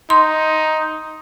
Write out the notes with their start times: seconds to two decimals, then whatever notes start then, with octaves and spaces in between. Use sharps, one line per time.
0.10 D#4 C6